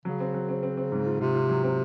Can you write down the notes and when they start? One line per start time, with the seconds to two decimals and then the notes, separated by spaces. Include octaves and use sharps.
0.05 C#3 F#3
0.20 C4
0.34 F#3
0.49 C4
0.63 C4
0.77 C4
0.92 G#2
1.06 F4
1.21 C3 F4
1.35 F4
1.49 F#3
1.64 C4